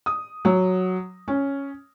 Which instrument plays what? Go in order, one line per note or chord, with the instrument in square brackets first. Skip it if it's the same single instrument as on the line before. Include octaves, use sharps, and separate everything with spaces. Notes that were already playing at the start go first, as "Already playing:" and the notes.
[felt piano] D#6
F#3
C#4